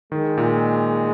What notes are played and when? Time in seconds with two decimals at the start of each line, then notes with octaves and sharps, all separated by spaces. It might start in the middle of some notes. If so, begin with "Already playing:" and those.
0.12 D#3 G#3
0.38 A#2